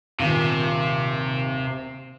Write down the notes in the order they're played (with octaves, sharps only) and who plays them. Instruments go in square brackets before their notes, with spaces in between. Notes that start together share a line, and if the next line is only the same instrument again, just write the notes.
[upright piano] D#1 G#1 [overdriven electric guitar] C3